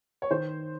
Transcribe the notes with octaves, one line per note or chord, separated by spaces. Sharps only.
C#5
D#3 C5